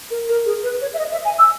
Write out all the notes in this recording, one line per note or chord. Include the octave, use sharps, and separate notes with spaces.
A#4
A#4
G#4
B4
C#5
E5
D#5
E5
G#5
E6